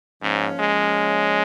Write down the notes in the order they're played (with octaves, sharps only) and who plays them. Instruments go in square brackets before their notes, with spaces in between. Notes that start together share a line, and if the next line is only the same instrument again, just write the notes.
[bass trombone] G#2 [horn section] F3 A#3 C#4
[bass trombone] G#3